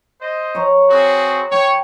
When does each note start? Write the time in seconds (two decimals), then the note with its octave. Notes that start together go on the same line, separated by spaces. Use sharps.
0.21 C5 D#5
0.55 C#5 A#5
0.91 C4 F#4 G#4
1.51 C#5 G5